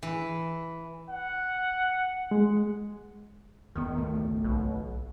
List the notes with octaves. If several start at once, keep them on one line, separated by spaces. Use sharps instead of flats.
E3
F#5
G#3
D#1 E2 D#3 B3
G#1 C#2 A3
B1